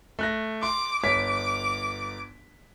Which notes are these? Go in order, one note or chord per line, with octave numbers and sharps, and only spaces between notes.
A3 F#6 A#6
C6 D6
G1 C#5 D6 B6